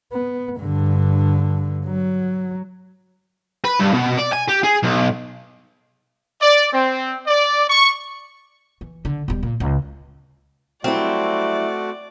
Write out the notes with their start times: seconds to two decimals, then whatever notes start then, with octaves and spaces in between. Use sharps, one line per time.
0.13 B3
0.58 G2 D3
1.87 F#3
3.64 B4
3.79 G2
3.93 B2
4.18 D5
4.32 G#5
4.48 G4
4.63 G#4
4.83 B1
6.41 D5
6.72 C4
7.27 D5
7.69 C#6
8.81 E3
9.05 D3
9.28 E1 G3
9.43 A#2
9.60 C#2
10.84 F#3 G3 A3 C4 E4 F#4 D5